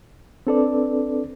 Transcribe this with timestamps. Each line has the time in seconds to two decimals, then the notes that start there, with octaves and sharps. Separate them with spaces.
0.47 C4 D4 A4 B4 D5